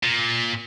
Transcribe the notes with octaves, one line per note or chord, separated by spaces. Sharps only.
A#2